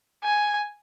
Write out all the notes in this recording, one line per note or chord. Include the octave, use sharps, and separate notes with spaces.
G#5